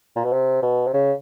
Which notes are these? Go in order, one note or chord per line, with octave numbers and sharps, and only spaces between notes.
A#2
B2
C3
B2
C3
C#3